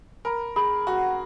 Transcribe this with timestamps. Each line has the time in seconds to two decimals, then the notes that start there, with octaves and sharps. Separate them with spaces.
0.25 A#4 B5
0.56 G#4 B5
0.87 F#4 F#5